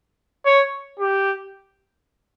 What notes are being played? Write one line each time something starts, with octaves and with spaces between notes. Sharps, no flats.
C#5
G4